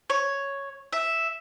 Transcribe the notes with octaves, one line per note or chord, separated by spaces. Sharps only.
C#5
E5